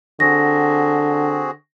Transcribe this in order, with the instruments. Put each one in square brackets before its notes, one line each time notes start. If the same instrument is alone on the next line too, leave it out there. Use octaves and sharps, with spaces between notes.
[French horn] D3 [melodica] C4 F#4 G#4 [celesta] A#6